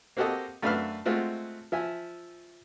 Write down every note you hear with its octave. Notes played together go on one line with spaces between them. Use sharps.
A#3 C4 F#4 G4 A4 D#5
F#2 A3 D4 B4 F5 F6
G#3 A3 C4 F4 F#4
F3 E5 G#5